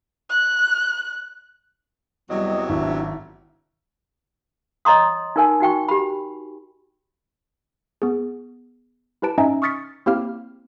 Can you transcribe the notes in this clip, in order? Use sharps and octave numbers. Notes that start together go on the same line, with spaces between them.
F#6
E2 C3 F#3 G3 D#5
G#1 D4 E4
C#5 D#5 A#5 C6 D#6
D#4 A#4 G#5
D#4 F#4 G5 C#6
G4 B5
B3 G#4
E4 G4 B4 A5 D7
C#4 D#4 D#5 E5 G#5 A#5
C#6 D#6 F6 A6 B6 C#7
A#3 C4 E4 G4 F5 F6